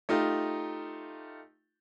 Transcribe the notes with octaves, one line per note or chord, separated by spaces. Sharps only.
A3 D#4 F4 G4